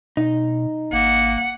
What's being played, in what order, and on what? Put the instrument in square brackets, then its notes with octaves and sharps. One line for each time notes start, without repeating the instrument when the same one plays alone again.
[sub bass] B2 [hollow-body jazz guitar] D#4
[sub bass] G#1 [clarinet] A#3 [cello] F#5